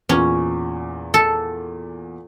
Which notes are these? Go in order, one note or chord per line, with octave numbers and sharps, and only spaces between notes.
E2 A#2 C#4
A4